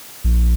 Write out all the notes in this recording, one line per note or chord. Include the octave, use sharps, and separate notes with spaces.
A#1